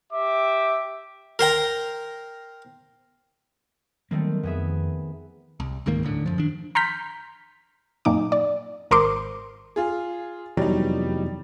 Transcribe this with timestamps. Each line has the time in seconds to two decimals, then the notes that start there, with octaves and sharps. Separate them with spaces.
0.12 G4 E5 D6
1.39 A#4 C5 G5 A#5
4.11 D#3 F#3 G3 A3 A#3 C4
4.43 F2 B3 G#4 E5
5.60 C2
5.86 C#2 G#2 D#3 A#3
6.03 D#1 A2 D3
6.26 F#2 F3
6.38 D#3 D4
6.75 A#5 C6 F6 G6 B6
8.05 F#2 A#2 D#4 D6
8.32 D5
8.91 G#1 A#4 C5 C6 D6
9.76 F4 G#4
10.57 F1 E2 F#3 G3 D#4